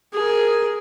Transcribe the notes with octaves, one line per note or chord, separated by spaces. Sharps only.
G#4 A#4